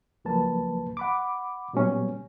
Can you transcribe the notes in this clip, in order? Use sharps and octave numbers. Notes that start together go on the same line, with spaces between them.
C#2 F3 F#3 A#3 B4 A5
F#5 B5 D6
A#2 F#3 G3 B3 C#4 C#5